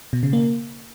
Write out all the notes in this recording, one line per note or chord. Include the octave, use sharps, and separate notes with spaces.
B2
C#3
A#3